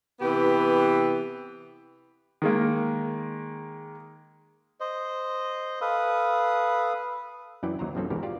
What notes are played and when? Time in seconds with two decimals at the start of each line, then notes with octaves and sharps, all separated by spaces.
0.21 C3 E3 B3 G4
2.42 D#3 G#3 A#3
4.80 C5 D#5
5.81 A4 B4 F5 D#6
7.63 F#2 E3 F#3 E4 D5 G5
7.79 D#2 F#3 C5 A#5
7.95 B1 G2 F3 C4 C#4 A4
8.10 E2 G#2 B2 G4 A#4
8.23 F4 G4 D5